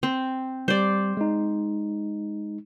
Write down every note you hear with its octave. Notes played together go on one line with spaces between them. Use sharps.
C4
G3 C5 D5
G#3 D#4